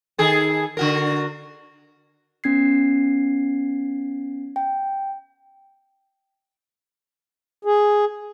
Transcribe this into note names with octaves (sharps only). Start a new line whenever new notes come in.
D#3 G#4 A4
D3 F#4 A#4
B3 C#4 G#6 C7
G5
G#4